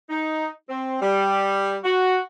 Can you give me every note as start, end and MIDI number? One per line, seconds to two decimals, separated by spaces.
0.10 0.47 63
0.69 0.96 60
1.02 1.75 55
1.84 2.18 66